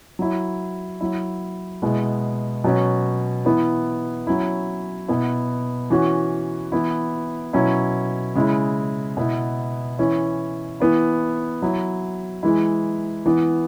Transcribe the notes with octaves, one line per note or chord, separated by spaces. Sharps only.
F#3 E4
F#3 E4
B2 G#3 E4
B2 F#3 C#4 F#4
E3 B3 E4
F#3 C#4 E4
B2 B3 E4
E3 C#4 F#4
E3 B3 E4
B2 F#3 C#4 E4
C#3 G#3 E4
B2 B3 E4
E3 C#4 E4
E3 B3 E4
F#3 E4
E3 G#3 E4
E3 B3 E4